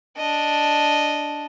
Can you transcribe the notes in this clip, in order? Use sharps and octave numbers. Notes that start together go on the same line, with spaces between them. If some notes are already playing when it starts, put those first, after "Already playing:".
D4 D#5